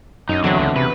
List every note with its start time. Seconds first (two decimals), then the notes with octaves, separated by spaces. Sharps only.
0.29 F#2 D#4
0.44 E2 D3 F#3 C4 F#4
0.59 C#2
0.76 C3 B4